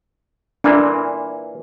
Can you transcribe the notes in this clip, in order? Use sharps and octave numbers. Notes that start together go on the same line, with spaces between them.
A#2 E3 A#3 D4